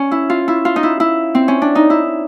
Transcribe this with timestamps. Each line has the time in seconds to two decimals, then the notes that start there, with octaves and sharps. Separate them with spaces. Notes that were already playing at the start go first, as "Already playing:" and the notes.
Already playing: C#4
0.11 E4
0.30 F4
0.48 E4
0.65 F4
0.76 D#4
0.83 E4
1.00 E4
1.35 C4
1.48 C#4
1.62 D4
1.75 D#4
1.90 E4